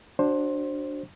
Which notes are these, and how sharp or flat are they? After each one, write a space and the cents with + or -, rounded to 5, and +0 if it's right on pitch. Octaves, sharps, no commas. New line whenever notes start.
D4 +0 F#4 +0 C5 +20